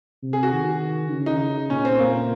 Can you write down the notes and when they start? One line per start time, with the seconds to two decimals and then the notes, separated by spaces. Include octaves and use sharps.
0.23 C3
0.33 G#4
0.43 F#4
0.52 D#3
1.11 C#3
1.26 D#4
1.70 A#2 C#4
1.85 C4
1.99 A#3